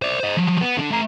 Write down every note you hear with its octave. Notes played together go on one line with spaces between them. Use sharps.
C5 D5
C5 D#5
F3 F#3
B3
D3 D4
A3 A#5